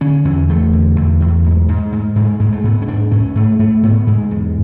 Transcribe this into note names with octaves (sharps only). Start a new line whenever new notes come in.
D3 C#4
E2 C#4
E2 A3
D3
E2
E2
G#2
G#2
G#2
G#2 G#3
G#2 G#3
A3
G#2 B3
C#4
G#2 D4
G#2 C#4
G#2 A3
G#2 A3
G#2 B3
G#2 G#3
E2